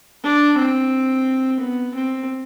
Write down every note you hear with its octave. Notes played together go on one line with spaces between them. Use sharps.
D4
C4
B3
C4